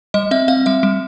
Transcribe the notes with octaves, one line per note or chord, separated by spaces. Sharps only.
G3 D#5
C4 E5
C4 F5
G3 E5
G3